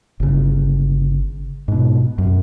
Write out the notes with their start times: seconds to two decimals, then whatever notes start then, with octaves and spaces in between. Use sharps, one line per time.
0.20 G1 C#3
1.68 G#2 B2
2.18 F#2